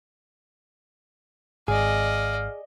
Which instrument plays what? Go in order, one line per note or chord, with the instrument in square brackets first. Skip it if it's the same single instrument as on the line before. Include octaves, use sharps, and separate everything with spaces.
[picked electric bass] G#1 [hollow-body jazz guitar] G#4 [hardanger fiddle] D5 D#5 [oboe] F5